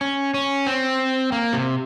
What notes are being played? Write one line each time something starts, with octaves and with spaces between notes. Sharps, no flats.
C#4
C#4
C4
A#3
C3